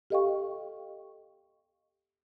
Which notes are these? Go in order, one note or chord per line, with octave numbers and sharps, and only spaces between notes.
G4 A4 D#5 F5 G5 C#6